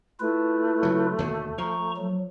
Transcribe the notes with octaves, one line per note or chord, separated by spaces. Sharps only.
A3 E4 F4 B4
C#3 F#3
D#2 B2 D3
F3 A#5 C#6
F#3